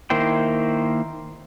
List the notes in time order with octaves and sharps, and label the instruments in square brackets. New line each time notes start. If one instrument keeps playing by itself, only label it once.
[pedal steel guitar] D#3 A#3 E4 C5 G5